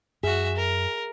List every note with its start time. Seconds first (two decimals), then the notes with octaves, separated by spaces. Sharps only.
0.24 F#2 F#4 G#4 E5
0.56 A#4